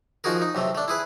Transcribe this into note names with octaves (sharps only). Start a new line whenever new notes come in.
F3 D#4 F#4 G#4 A#4
D#4
B1 C3 A3
A3 D4
E4 G#4 B4